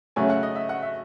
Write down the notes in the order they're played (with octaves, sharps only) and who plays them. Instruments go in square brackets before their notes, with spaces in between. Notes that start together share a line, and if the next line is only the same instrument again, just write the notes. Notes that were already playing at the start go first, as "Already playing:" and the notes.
[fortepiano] C#3 F#3 A3 C#4 F#4 [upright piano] G#5
[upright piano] F#5
D#5
E5
F#5
E5